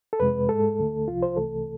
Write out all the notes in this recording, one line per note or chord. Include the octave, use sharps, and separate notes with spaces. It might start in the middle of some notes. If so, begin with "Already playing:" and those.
A4
F2 C3 G#3 B4
G#2 G#3 A4
D2 D3 A3
C2 C3 F3 F4
C5
C2 C3 E3 A3 A4